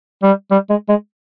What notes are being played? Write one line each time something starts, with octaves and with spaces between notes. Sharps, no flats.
G3
G3
G#3
G#3